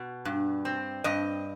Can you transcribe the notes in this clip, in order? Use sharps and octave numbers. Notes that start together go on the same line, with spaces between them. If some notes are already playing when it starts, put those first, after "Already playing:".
Already playing: B2
G2
C4
G2 D#5